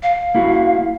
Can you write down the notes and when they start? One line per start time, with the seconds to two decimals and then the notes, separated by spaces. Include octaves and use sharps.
0.03 F5
0.35 A#3 E4 F#4